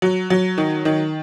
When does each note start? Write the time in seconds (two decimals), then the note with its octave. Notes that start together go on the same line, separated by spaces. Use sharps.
0.02 F#3
0.30 F#3
0.58 D#3
0.85 D#3